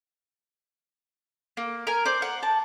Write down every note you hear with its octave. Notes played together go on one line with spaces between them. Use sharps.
A#3
A#4 G#5
C5 D5
F#5
A5